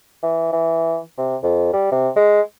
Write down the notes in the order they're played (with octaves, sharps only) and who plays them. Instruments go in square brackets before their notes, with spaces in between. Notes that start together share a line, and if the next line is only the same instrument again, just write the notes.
[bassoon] E3
E3
C3
F2
G3
C3
G#3